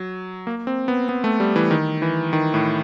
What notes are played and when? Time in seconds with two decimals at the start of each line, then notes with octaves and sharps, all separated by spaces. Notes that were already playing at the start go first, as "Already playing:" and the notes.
Already playing: F#3
0.47 A#3
0.67 C4
0.88 B3
1.09 B3
1.24 A3
1.40 G3
1.56 E3
1.71 D#3
2.02 E3
2.33 D#3
2.54 A2